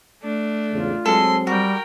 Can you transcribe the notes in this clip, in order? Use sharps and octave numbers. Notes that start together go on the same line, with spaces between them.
A3 D4
E2 G#2 C#3 F4
F#3 G#3 C4 A4 C6
G3 F#4 A#4 G5